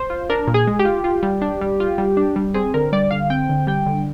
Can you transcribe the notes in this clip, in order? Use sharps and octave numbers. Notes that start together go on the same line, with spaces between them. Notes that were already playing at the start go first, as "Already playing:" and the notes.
Already playing: C5
F4
D4 A#4
A#2
G#4
G#3
G4
F4
F4
G3
D4
G3
F4
G3
D4
G3
C4 G#4
D3 A#4
G3 D5
D3 F5
C4 G5
D3
G3 G5
D3